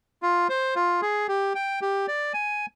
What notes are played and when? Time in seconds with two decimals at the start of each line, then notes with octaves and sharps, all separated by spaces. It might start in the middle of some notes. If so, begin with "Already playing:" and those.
0.22 F4
0.49 C5
0.76 F4
1.02 G#4
1.28 G4
1.55 G5
1.82 G4
2.08 D5
2.34 G#5